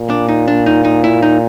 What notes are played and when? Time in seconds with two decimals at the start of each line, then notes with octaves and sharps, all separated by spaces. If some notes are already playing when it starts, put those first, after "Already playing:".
Already playing: A#2
0.10 D4
0.29 D#4
0.48 D4
0.66 D#4
0.85 D#4
1.04 E4
1.22 D#4